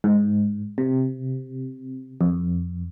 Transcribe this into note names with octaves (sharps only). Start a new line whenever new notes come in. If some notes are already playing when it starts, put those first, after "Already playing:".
G#2
C3
F2